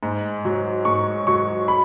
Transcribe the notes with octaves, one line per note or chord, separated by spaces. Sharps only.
G#2
F#3
G#2 C#6
F#3 C#6
B5